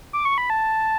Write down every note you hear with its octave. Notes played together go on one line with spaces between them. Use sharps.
D6
C#6
B5
A5